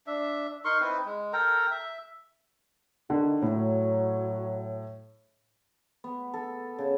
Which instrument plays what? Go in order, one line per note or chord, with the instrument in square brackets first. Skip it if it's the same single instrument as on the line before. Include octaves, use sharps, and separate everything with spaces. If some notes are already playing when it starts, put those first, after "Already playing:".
[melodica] D4 E5
D#4 A#4 C6 C#6
C4 D#4 E4 B4
G#3
A4 A#4 G5 A#5
E5
[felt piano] D3 [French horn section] D#3
[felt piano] A2 [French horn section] F#3
[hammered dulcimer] B3
A4
C#3